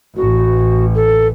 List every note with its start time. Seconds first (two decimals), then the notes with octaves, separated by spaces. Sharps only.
0.16 A1 F#4
0.95 A4